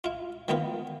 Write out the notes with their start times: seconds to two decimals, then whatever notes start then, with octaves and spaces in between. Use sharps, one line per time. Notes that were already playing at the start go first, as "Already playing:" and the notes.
0.04 E4 F4
0.48 D#3 E3 A#3 B3 F4 B4